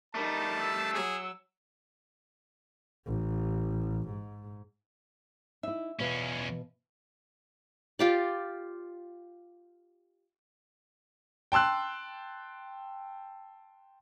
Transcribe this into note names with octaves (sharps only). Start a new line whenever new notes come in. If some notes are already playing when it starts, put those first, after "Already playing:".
G3 A3 D#4 A#4 A5
E6
F#3 G#4
A1
G#2
D#4 E4 E5
E2 B2 C#4 F4 B4
F4 G4 D5
G5 A5 C6 E6 F#6